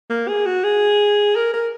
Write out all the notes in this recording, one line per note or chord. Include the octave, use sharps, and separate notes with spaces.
A#3
G#4
F#4
G#4
A#4
A#4